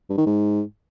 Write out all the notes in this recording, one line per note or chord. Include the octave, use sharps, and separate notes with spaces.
G2
D#3
G#2